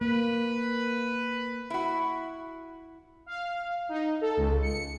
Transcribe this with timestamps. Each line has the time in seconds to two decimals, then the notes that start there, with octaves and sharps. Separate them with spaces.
0.01 A#3 B4
1.70 E4 F#4
3.26 F5
3.89 D#4
4.21 A4
4.37 C#2
4.62 C#7